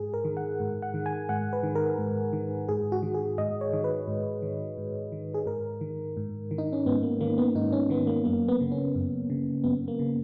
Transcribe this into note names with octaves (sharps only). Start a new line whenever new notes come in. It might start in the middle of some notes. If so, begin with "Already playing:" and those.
Already playing: G#2 G#4
A#4
D#3
F#5
G#2
F#5
D#3
G#5
G#2 F#5
B4
D#3
A#4
G#2
D#3
G#2 G#4
F#4
D#3
G#4
G#2 D#5
C#5
D#3
B4
G#2
D#3
G#2
D#3
G#4
G#2 A#4
D#3
G#2
D#3
D#4
C#4
G#2 B3
A#3
D#3 A#3
B3
G#2 D#4
C#4
D#3 B3
A#3
F#2 A#3
B3
C#3
C#4
F#2
C#3
F#2 B3
A#3
C#3